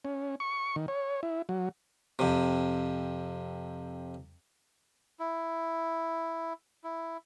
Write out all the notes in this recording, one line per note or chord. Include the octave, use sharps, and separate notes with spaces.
C#4
C#6
D#3
C#5
E4
F#3
F2 C3
E4
E4